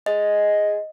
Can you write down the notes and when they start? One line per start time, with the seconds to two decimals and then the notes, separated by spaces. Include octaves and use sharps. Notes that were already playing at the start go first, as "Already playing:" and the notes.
0.06 G#3 D#5